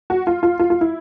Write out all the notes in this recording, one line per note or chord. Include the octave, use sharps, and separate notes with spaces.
F#4
F4
F4
F4
F4
E4